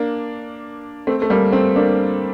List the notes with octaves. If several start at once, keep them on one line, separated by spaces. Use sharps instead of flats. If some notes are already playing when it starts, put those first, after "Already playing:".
Already playing: A#3 D4
A3 C4
A3
G3 A#3
A3 C4
A#3 D4